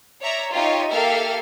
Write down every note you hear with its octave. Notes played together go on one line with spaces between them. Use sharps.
C#5 D5 E5 A#5
D#4 F4 G4 C#5 E5
A#3 G4 A4 E5 F5 F6